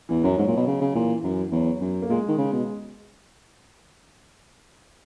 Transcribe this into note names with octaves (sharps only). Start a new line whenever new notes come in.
E2 E3
F#2 F#3
G#2 F#3
A#2
B2
C#3
C#3
A#2 E3
F#2
E2 F#3
F#2
A#3
A#2 G#3
D#3
C#3
B2